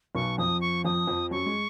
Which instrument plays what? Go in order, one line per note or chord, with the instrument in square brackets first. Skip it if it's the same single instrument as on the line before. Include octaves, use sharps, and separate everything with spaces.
[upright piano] B1 B2 [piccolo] C#6
[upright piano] F2 F3 [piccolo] D#6
[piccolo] C#6
[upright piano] F2 F3 [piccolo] D#6
[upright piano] F2 F3
[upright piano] F#2 F#3 [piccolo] C#6
[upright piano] G#3